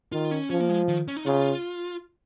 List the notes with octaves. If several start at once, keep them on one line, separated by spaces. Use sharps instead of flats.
D#3 F4
C#4
F3 C#4
A#3
G#3
D#3
C#4
D#4
C#3 F4